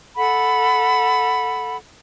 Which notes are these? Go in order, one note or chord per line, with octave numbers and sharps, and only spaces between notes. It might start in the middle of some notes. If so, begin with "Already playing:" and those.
A4 F#5 B5